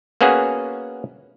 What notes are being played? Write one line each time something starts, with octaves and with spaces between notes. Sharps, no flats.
A#3 B3 C#4 F#4 G#4 F#5